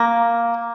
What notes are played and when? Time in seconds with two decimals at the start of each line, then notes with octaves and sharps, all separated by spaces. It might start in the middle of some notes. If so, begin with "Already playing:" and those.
Already playing: A#3